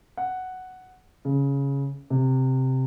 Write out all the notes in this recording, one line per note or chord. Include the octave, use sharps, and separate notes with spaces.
F#5
C#3
C3